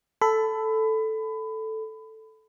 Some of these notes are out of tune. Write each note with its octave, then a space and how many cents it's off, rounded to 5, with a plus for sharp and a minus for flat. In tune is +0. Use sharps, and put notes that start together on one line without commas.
A4 +0 B5 +25